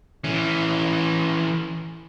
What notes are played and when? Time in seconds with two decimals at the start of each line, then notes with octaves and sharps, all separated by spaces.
0.24 E3 C#4